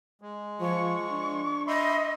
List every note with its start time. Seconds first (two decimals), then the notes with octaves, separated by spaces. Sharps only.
0.21 G#3
0.60 F3 C#6
1.12 D4
1.67 D#5 E5 B5 C6